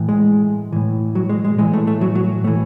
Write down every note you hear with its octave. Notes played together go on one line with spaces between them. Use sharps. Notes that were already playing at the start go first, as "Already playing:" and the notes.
Already playing: A2 E3
G#3
A2 E3
F#3
G#3
G#3
A2 E3 G#3
A3
A3
F#3
F#3
A2 E3 A3